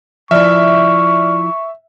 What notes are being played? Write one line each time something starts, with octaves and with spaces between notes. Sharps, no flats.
F3 E4 D5 E5 C#6 F6